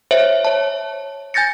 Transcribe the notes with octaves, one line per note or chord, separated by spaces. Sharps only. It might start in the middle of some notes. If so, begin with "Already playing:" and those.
C5 C#5 E5
C#5 A5
G#5 G6 A6 A#6 C#7